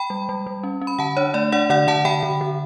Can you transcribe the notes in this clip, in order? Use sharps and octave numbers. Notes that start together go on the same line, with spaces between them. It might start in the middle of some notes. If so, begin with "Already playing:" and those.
Already playing: G5 B5
G3
G3
G3
C#4
C#4
B5
D3 F#5 A5
D4 C#5
A3 D5
D4 D5 F#5
D3 D5 F#5
D3 F#5 A5
D3 G5 B5
D3
D3